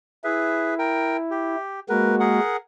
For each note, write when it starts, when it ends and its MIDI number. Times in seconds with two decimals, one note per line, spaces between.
0.24 1.56 64
0.24 0.74 68
0.24 0.74 71
0.24 0.74 76
0.79 1.17 70
0.79 1.17 79
1.31 1.80 67
1.89 2.39 56
1.89 2.39 58
1.89 2.39 66
1.89 2.16 70
1.89 2.16 71
2.20 2.57 68
2.20 2.57 70
2.20 2.57 78